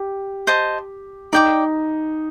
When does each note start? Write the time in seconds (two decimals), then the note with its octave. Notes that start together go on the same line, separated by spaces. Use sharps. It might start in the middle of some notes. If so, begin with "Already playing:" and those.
Already playing: G4
0.47 C5 D#5 A5
1.33 D#4 D5 G5 D6